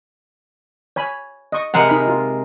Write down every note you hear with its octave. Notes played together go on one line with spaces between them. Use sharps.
C#5 G#5 B5
D#5 C#6
C3 G#3 A#4 F#5
D#4 B5
F4